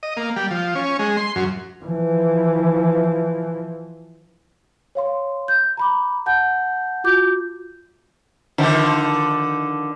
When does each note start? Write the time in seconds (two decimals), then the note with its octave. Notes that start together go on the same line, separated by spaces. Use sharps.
0.03 D#5
0.17 A#3
0.36 G3
0.51 F3
0.75 C#4
0.99 G#3
1.17 C6
1.36 F#2
1.84 E3 F3
4.95 C#5 F5 C6
5.48 G6
5.77 A#5 B5 D6
6.26 F#5 A5 G6
7.04 F4 F#4 D6 G6
8.58 D3 D#3 F3